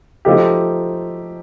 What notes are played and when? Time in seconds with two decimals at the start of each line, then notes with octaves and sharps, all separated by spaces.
0.25 F3 A3 D#4 G4